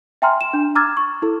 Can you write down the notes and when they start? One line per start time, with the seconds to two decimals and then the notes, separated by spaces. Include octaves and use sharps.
0.22 E5 G5 G#5 A#5 C6 F6
0.41 E7
0.53 D4
0.75 A#5 D6 E6 F6 G#6 A6
0.97 C#6
1.22 E4 A4